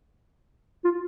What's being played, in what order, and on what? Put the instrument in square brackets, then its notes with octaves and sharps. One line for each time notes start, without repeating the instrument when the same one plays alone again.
[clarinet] F4